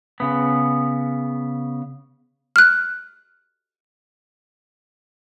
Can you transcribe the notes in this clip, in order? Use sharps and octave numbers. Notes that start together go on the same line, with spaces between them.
C#3 B3
F6 F#6